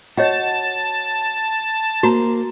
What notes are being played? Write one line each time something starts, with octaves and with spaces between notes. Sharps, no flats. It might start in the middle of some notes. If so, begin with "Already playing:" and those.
F#4 C#5 D#5 F#5 A5
A#3 F#4 C5 A#5